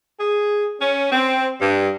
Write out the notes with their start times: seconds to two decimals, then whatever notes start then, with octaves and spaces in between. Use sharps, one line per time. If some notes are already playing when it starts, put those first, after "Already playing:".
0.20 G#4
0.80 C#4
1.11 C4
1.61 G2